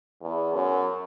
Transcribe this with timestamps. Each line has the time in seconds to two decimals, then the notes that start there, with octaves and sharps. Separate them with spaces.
0.21 E2
0.54 F#2